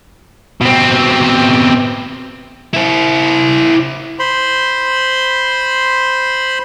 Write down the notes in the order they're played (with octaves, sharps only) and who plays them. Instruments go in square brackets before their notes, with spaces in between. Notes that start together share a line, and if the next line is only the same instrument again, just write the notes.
[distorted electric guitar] B2 C4
E4 C5
[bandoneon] C5 B5 C6